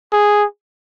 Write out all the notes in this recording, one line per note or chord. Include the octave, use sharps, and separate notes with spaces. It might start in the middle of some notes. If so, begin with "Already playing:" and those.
G#4